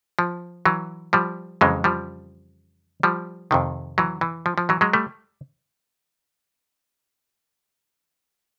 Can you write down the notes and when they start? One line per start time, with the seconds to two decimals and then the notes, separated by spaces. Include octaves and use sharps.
0.19 F3
0.65 E3 F#3
1.13 F3 G3
1.61 F2 C#3 E3 F#3 G#3
1.84 F3 G3
3.03 F3 G3
3.51 F2 C3 D#3
3.98 E3 F#3
4.21 E3
4.46 F3
4.58 F3
4.69 E3 F#3
4.81 F#3 G#3
4.93 G3 A3